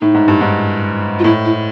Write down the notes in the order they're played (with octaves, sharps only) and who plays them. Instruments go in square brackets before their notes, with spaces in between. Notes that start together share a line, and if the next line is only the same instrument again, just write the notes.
[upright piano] A2 [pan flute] D#4
[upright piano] G#2
G2
G#2
[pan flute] F4
[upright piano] A2 [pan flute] E4
[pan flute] E4